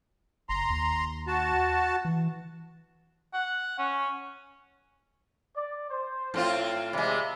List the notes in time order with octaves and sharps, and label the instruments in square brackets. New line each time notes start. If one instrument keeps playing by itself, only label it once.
[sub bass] F#1 [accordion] A#5 C6
[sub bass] D#2
[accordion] F#4 A5
[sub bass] E3
[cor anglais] F#5
C#4
[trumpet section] D5
C5
[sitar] A2 C4 F4
[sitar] C3 G#3 [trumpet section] D5 E5 B5